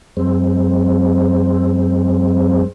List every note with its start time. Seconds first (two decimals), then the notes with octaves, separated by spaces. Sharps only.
0.17 F#2 G#3 C4